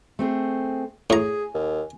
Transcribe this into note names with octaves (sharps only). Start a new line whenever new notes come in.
A3 C4 G#4
A2 G#4 G#5 A#5
D#2